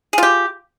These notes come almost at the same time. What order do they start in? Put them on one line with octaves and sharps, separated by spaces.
G#4 F4 G4